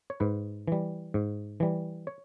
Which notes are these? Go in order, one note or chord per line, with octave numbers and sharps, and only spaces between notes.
C#5
G#2 B4
E3 G3
G#2
E3 G3
C#5